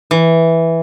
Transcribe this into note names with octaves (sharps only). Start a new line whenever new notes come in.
E3